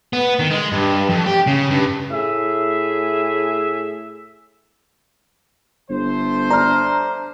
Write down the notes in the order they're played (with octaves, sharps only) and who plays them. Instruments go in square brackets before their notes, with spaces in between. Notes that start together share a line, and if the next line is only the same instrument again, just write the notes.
[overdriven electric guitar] B3
D#3
G#3
G2
F2
G4
C#3
G2
[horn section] A2 G#4 E5
[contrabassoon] G1 [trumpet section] A3 C5
[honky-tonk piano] D4 F6 [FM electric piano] A#5